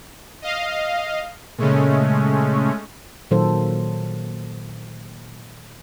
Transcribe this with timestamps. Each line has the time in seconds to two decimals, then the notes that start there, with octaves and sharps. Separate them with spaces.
0.42 D#5 F5
1.59 A#2 C#3 G#3 A3 C#4
3.31 A#2 D#3 F#3 A#3 A4 C5